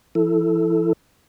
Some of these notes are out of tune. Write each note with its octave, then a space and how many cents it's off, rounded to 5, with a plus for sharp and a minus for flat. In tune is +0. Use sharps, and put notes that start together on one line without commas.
F3 -40 E4 +0 A4 +0